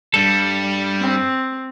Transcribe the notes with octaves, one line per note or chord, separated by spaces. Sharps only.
G2 G3 A4
C4